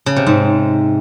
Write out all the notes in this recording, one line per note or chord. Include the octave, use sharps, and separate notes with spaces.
C#3
C3
G#2